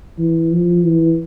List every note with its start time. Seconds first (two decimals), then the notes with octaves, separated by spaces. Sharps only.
0.19 E3
0.52 F3
0.85 E3